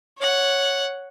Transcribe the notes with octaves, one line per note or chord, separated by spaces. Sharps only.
C#5 F#5